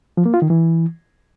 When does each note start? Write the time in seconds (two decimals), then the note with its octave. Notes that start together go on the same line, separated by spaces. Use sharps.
0.17 F3
0.26 A#3
0.34 F4
0.42 D#3
0.50 E3